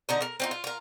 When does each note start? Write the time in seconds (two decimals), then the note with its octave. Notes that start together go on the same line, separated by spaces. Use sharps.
0.09 D3 D#4 A#5
0.22 A#4
0.40 C4 D#4 F4
0.51 F4
0.64 F4 A#4